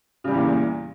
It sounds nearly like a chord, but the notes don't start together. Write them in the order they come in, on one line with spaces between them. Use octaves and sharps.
C#3 G3 E3 E2 A#2